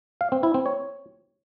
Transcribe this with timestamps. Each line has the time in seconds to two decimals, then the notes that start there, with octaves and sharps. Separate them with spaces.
0.21 F5
0.32 C4
0.43 E4
0.54 C4
0.66 C#5